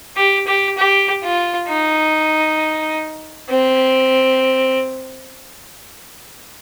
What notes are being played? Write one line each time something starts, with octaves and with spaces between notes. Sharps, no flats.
G4
G4
G4
F4
D#4
C4